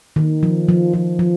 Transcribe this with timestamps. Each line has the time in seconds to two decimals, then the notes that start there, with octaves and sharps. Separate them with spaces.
0.16 D#3
0.43 F3
0.68 F3
0.94 F3
1.19 F3